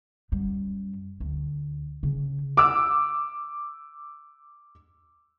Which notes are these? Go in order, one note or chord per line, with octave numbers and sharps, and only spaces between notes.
F#2 G3
D2
C#3
D6 E6